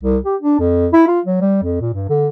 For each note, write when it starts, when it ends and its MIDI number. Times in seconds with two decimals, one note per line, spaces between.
0.03 0.18 36
0.26 0.36 67
0.41 0.57 62
0.59 0.87 41
0.93 1.03 64
1.07 1.20 65
1.25 1.39 54
1.41 1.59 55
1.63 1.79 41
1.81 1.91 46
1.94 2.09 43
2.09 2.28 50